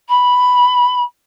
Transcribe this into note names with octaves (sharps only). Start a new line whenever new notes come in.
B5